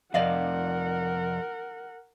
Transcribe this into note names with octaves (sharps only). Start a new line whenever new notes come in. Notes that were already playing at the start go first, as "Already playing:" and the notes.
F2 C3 A#4 D5 D#5 F5 F#5